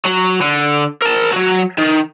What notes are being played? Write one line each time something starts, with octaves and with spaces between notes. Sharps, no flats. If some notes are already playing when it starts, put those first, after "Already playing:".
F#3
D3
A#4 A5
F#3 F#4
D#3